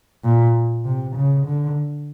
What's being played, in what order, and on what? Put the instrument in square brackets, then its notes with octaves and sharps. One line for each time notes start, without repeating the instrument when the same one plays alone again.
[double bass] A#2
C3
C#3
D3